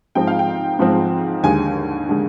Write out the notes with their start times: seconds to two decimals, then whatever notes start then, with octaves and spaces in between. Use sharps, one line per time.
0.15 G#2 F3 G#3 C4 G5
0.27 F5
0.39 G5
0.79 G#2 F3 G#3 C4
1.43 D#2 D3 G#3 G#5
2.09 D3 G#3